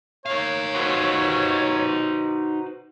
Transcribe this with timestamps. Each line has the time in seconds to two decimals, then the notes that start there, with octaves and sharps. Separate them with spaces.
0.26 D#4 C#5 F5
0.76 F#4 B4 C5